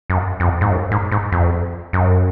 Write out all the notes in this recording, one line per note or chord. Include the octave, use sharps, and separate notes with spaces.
F#2
F2
G#2
F#2
G#2
G#2
F2
F#2